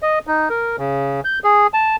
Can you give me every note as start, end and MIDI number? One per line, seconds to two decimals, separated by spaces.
0.03 0.19 75
0.27 0.49 63
0.50 0.76 70
0.79 1.21 49
1.25 1.39 91
1.44 1.67 68
1.74 1.96 81